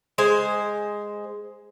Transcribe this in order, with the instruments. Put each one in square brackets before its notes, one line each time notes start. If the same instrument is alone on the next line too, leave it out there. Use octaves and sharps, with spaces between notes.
[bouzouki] G#3 C5 G#5